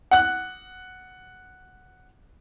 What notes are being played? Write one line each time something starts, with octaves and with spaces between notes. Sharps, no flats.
F#5 F#6